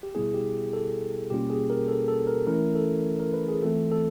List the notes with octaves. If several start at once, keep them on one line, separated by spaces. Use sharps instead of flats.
G4
B2 G3 B3 E4 G#4
G4
A4
B2 G3 A#3 C#4 F4 G4
G#4
A#4
A4
A4
A#4
E3 A3 C#4 E4 A#4
A4
A#4
B4
G#4
E3 A3 C4 F4 A4
A4